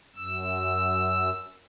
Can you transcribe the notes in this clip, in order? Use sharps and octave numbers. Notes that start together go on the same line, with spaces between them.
F#2 E6